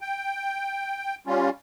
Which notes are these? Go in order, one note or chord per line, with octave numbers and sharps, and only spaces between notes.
G5
G3 C#4 F4